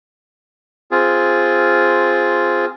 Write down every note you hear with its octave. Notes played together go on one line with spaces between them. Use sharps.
C4 F4 G#4